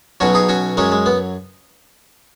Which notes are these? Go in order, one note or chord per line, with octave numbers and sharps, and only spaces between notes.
B1 B2 F#3 C#4 F#4
D#4 G#4
C#4 F#4
F#2 F#3 G#3 C#4
G#3
B3